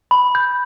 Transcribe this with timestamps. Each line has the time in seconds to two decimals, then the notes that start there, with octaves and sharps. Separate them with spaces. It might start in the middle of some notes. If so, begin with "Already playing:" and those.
0.11 B5
0.35 G6